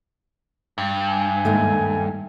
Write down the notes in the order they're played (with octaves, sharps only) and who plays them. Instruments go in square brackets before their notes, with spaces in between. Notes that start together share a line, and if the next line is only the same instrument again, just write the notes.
[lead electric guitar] G2
[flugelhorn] G#5
[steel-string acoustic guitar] D#2 G#2 A3